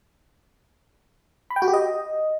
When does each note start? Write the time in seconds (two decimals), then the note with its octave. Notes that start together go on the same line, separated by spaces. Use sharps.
1.50 B5
1.56 G5
1.62 F#4
1.68 G4
1.73 D#5